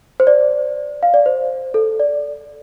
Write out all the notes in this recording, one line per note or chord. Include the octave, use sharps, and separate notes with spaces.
C5
D5
F5
D5
C5
A4
D5